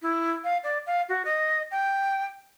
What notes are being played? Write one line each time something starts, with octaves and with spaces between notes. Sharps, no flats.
E4
F5
D5
F5
F#4
D#5
G5